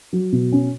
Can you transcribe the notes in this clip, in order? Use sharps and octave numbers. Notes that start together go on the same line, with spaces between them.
F#3
B2
C#4